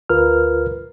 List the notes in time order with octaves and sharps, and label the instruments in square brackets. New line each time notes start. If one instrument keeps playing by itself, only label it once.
[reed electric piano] D2 F4 A#4 B4 F6